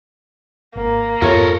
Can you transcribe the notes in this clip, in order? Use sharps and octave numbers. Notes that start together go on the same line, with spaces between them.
G#1 A#3
F2 G#2 B3 F4 A4 A#4 C#5